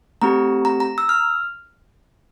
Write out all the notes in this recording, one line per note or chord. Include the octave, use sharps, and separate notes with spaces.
A3 C4 G4 A#5
A#5
A#5
E6
F6